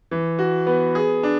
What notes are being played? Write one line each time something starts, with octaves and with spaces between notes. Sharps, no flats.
E3
F#4
B3
G#4
D4